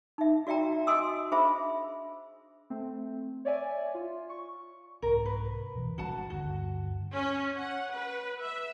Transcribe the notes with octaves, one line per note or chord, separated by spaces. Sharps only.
D#4 E5
F#4 D5 E5 G5 A#5
F#4 D#5 G#5 C6 D#6 E6
D4 G#4 C5 E5 B5
A3 C4
C#5 D5 E5 G#5
F4
C#6
C2 G#2 A#4
B4
D1 B2 E3
G#1 G3 D4 F#4 F#5 A5
D2 G2 F#4
C#4
F#5
B4
E5